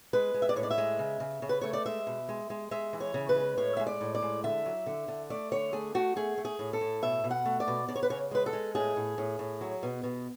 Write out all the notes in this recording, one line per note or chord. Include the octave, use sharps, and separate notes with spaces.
G#3 B4
G#3
E5
D5
A2 C#5
D5
E5
G#3
C#3
C#3
C#3
B4
A3 C#5
D5
G#3 E5
B2
G#3
G#3
G#3 E5
E3
C#5
C#3
B4
G#3
A2 C#5
G#3 E5
D5
A2
D5
G#3
D3 E5
F#3
D3
D3
A3 D5
D3 C#5
A3 G#4
A3 F#4
A3 G#4
A3
G#4
A2
A4
A2
B2 E5
B2
F#5
A3
D5
B2
C#3 D5
C#5
B4
C#3 C#5
G#3 B4
A4
G#3
A2 G#4
A2
A2
A2
F#3
B2
B2